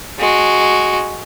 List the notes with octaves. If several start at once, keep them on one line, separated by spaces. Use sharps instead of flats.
G#3 F#4